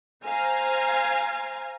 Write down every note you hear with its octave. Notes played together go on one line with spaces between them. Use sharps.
C5 F5 G#5 A#5